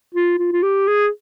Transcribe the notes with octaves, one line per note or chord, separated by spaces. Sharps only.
F4
F4
F4
G4
G#4